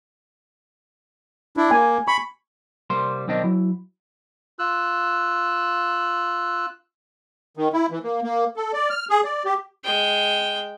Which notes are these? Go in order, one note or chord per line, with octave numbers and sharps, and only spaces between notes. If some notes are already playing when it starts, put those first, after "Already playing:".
D4 E4
A#3 G#5
B5 C#6
C2 G3 A#3 C5 C6
B1 D#3 C4 D4 D#5
F#3 E4
F4 E6 F#6
D#3
E4
E3
A#3
A#3
A4
D5
F6
G#4
D5
G4
G#3 G5